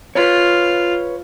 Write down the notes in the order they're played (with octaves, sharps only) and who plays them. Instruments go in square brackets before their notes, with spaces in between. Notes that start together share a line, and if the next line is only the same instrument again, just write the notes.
[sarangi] F4 [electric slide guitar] B4 C#5